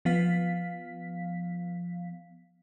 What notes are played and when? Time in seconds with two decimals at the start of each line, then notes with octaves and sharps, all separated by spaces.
0.05 F3 B3 F5 B6